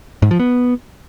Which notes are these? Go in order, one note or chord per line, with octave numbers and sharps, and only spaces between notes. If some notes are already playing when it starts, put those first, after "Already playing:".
G#2
F3
B3